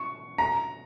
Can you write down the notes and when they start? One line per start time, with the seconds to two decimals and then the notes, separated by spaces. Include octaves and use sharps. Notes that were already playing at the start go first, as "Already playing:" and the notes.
Already playing: C#6
0.38 A#5